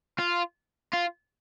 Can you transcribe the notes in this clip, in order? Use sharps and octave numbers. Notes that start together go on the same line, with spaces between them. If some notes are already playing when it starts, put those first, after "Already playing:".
F4
F4